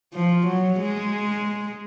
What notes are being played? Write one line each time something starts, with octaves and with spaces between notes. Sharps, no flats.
F3
F#3
G#3